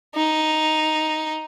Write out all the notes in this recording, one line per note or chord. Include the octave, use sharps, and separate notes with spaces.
D#4